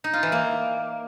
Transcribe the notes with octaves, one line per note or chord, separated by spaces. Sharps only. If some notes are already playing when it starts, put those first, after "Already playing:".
D#4
F4
E3
A#3